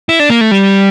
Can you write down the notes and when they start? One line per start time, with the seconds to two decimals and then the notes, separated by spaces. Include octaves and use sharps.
0.09 E4
0.20 D4
0.30 A#3
0.41 A3
0.51 G3